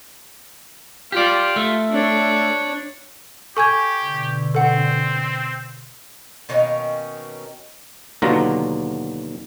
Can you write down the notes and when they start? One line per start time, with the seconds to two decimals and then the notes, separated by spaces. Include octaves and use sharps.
1.12 F4 G4 D5
1.56 A3
1.91 D4 C#5
3.57 G4 A4 G#5 C#6 G6 G#6
4.05 B2 D3
4.55 C4 A4 F#5
6.49 B2 D#3 A#3 C#4
8.22 D#2 B2 D3 F#3 F4 A#5